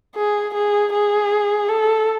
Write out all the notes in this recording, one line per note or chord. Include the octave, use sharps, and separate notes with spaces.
G#4
G#4
G#4
A4